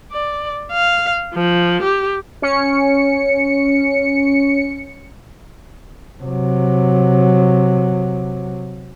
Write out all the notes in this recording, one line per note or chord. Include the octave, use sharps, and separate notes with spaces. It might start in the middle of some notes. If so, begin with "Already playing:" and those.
D5
F5
F3
G4
C#4 C#7
C3 F#3